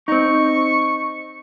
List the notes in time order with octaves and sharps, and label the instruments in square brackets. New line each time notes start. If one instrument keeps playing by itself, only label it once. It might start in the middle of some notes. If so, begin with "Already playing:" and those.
[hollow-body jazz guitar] C4 D#4 [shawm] C#6